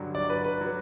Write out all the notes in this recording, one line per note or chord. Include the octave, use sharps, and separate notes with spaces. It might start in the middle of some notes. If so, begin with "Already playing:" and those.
Already playing: G2 D3 F#3
D5
B4
B4
F#3